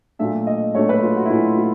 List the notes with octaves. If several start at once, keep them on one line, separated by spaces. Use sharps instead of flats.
A#2 F#3 A3 D4 E5
D#5
A#2 F#3 A3 D4 C#5
B4
F4
F#4
E4
A#2 F#3 A3 D4 F4
F4